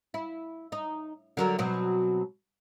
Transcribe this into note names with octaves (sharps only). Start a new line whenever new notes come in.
E4
D#4
D3 F#3 A#4
B2 F#3 C4